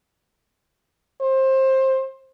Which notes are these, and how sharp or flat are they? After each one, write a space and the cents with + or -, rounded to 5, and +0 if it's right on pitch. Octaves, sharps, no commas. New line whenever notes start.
C5 +20